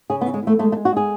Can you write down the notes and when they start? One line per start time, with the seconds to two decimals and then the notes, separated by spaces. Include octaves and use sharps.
0.10 C#3 G#4
0.21 B3
0.26 E3
0.34 G#3
0.43 E3 A3
0.59 G#3 A3
0.72 A3
0.77 G#3
0.85 F#4
0.92 G#3 G#4